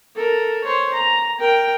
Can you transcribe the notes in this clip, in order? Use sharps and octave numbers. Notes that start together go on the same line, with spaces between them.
A4 A#4
C5 C#5
A#5
A#4 G5